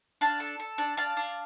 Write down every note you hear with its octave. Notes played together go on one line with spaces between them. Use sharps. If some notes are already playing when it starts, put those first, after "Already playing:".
D4 F5 A5
A4
A4
D4
D4 F5 A5
D4